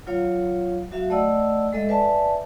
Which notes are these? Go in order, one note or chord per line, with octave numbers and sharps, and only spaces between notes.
F#3 F4 C#5 F5
F#3 F#4 E5 F5
A3 D5 D#5 F#5 E6
G#3 A4 D#5 E5
B4 D5 E5 G#5 A5